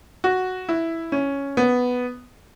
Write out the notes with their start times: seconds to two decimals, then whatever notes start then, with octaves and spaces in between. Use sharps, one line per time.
0.24 F#4
0.69 E4
1.12 C#4
1.57 B3